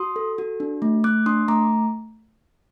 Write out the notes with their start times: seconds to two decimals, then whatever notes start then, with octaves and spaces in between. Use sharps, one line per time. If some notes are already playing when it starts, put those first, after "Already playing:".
Already playing: F#4 C6 D#6
0.16 A4
0.38 F#4
0.60 D4
0.82 A3
1.04 A3 D6 F#6
1.26 D4 C6 D#6
1.48 A3 A#5 D6